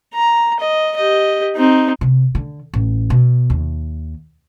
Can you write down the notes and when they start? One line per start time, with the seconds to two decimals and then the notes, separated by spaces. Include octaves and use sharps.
0.14 A#5
0.60 D#5
0.96 G4 D#5
1.56 C4 D#4
2.01 C3
2.35 D3
2.74 A1
3.10 B2
3.50 D#2